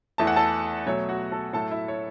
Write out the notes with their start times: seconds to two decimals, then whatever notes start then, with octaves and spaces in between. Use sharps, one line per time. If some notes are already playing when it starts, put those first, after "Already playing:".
0.18 E2 E3 A3 A5
0.27 F#5
0.36 A4 A5
0.86 B2 F#3 A3 C#5
1.09 F#4 F#5
1.32 A4 A5
1.53 A2 F#3 A3 A4 A5
1.71 E4 E5
1.88 C#5